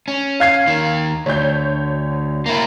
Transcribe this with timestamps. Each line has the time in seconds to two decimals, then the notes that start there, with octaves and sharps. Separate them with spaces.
0.08 C#4
0.40 F5 G#6 C7
0.67 D#2 D#3
1.26 D2 C#5 G6
2.46 A#3 E4